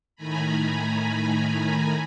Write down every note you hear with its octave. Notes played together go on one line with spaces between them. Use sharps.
A2 D#3 A3 G#5 A#5 B5